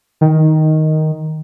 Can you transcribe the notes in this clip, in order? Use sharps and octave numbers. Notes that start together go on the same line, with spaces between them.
D#3